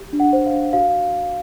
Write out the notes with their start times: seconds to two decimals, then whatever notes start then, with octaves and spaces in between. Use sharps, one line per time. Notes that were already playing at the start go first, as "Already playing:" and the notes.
Already playing: G4
0.13 D4
0.20 F#5
0.33 C5
0.46 F5
0.53 D4
0.73 F#4 F5